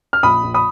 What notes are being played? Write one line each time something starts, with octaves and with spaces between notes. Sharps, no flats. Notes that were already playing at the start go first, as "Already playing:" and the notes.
F6
A#1 B5 D#6
A#1
B5 D#6